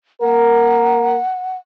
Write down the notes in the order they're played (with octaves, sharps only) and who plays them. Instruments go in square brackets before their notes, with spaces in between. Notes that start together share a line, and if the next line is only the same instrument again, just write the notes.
[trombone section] A#3 A#4 [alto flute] F#5